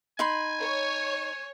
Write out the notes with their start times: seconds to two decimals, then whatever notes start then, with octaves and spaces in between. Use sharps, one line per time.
0.19 D#4 G#5 B5 C6
0.61 C#5